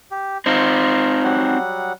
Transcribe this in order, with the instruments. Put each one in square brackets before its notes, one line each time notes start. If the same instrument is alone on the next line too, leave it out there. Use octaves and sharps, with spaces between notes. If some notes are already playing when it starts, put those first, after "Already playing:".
[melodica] G4
[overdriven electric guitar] C4 D#4 [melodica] F4 A#5
[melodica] F#3 G3 F#5